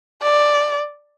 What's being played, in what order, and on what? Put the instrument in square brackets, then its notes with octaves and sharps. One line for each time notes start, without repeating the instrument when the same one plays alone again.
[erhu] D5